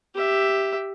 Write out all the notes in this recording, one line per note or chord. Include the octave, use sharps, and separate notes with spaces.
G4 E5